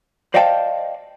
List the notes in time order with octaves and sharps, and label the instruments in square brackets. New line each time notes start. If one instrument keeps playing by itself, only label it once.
[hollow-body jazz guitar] C5 D5 D#5 F5 G5 A5